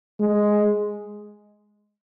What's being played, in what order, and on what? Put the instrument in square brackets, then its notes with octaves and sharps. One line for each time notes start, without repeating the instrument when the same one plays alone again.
[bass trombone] G#3